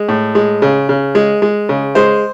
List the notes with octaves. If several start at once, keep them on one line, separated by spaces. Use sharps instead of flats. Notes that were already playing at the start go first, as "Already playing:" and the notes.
Already playing: G#3
A2
G#3
C#3
C#3
G#3
G#3
C#3
G#3 C5